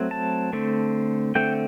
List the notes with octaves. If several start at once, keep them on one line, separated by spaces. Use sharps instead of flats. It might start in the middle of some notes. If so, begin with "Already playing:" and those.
Already playing: F#3 A3 C4
A5
D3 A3 C4
D3 A3 C4 G5